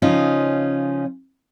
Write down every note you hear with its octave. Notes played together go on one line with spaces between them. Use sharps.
C#3 F3 C#4 D#4 F4